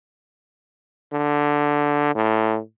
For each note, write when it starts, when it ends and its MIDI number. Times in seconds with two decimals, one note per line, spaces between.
1.13 2.11 50
2.15 2.59 45